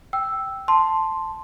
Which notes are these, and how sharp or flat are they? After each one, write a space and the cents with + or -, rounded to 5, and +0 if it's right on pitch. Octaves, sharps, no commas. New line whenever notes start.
G5 -10 E6 +0
A5 +0 C6 +0